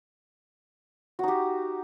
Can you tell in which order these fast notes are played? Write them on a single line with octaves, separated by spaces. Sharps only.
F#4 D#4 G4